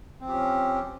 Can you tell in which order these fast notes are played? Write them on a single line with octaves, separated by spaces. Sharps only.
C4 F3 G4 C#4